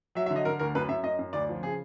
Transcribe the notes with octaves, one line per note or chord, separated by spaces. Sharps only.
F#3 E5
E5
D3
D#5
D3 A#4
D2 A#4
F#2 B4
F#2 E5
F#2 D#5
F#2
D2 D5
F3
C#3 G#4